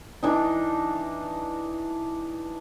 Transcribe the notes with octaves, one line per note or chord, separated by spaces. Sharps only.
E3 D4 D#4